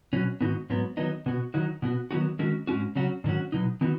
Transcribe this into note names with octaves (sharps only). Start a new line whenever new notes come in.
B2 F#3 C#4 F#4
G#2 D#3 B3 D#4 F#4
G#2 F#3 B3
D#3 F#3 B3 D#4
B2 B3 F#4
D#3 F#3 D#4 F#4
B2 B3 F#4
D#3 F#3 B3 D#4 F#4
D#3 G#3 C#4 F#4
G#2 G#3 C#4 F#4
C#3 F#3 C#4 F#4
G#2 D#3 F#3 C#4 F#4
B2 F#3 D#4
D#3 B3 D#4 F#4